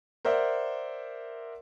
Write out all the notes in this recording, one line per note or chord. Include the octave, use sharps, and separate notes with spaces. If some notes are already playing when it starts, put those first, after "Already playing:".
A#4 C5 D5 E5 F#5